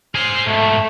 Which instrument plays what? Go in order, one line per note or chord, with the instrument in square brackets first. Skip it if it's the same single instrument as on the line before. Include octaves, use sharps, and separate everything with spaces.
[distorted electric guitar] G#4 C5 [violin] F6 C7
[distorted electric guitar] G#2 B2 [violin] A3